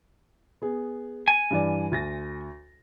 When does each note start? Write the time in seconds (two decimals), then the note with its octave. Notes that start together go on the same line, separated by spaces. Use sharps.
0.62 B3 G#4
1.28 G#5
1.51 G2 E3 D5
1.92 D2 A6 A#6